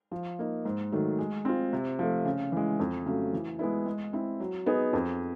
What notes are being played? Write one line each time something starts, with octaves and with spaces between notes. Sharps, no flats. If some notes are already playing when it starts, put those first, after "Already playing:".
F3
A#3 D#4
G#2
D#3 F#3 A3
G#3
C4 F4
C3
F3 A3
C#3
E3 G#3
F2
C#3 F#3 A3
E3
G#3 B3 E4
G#3
C4 E4
F#3
B3 D#4 G#4
F2